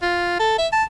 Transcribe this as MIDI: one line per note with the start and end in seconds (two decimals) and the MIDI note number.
0.02 0.39 65
0.40 0.57 69
0.58 0.67 76
0.73 0.84 81